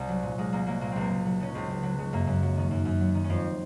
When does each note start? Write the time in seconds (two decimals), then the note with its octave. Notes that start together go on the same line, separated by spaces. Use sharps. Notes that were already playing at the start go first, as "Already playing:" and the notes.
Already playing: C2
0.09 F#3
0.23 A#2
0.38 C2 G#3
0.53 C2 A#3
0.66 F#3 A#3
0.81 A#2 A#3
0.92 C#2 C4
1.01 A#3
1.10 C#2
1.26 F#3
1.40 C#3 C#4
1.55 C#2 C4
1.70 C#2
1.83 F#3
1.99 C#3
2.13 F#2 A#3
2.27 F#2
2.43 F#3
2.57 D#3
2.71 F#2
2.85 F#2
3.01 F#3
3.15 D#3
3.24 C#4
3.30 F2 C4